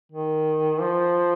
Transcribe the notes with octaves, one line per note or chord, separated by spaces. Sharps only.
D#3
F3